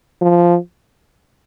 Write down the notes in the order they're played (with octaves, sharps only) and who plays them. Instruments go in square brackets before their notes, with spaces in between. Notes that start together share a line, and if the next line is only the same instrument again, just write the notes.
[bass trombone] F3